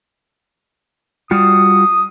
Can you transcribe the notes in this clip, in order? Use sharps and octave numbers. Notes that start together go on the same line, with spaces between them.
G3 F4 F#4 D#6